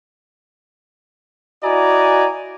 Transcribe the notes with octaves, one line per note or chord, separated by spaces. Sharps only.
E4 F#4 D5 D#5 G#5 A#5